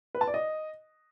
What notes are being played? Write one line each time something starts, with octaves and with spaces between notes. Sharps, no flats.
B4
A5
D5
D#5